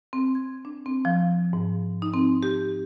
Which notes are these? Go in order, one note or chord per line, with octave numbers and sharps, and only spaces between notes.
C4
G#6
D4
C4
F3
G#2
D#4
C4
G4